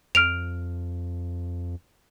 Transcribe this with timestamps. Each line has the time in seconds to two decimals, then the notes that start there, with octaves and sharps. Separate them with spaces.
0.15 F2 F6 D7 F7